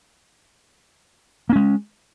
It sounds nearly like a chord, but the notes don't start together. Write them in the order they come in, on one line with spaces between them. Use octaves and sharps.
A#3 C#4 G#3